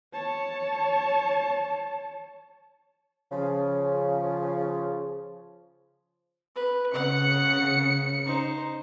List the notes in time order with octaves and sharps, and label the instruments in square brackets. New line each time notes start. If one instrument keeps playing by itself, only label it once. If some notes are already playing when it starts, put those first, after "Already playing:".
[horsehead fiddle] C#5 A5
[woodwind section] C#3 F3
[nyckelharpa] B4
[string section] C#3 C#7 [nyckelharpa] F#5
[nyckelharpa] D#4 C5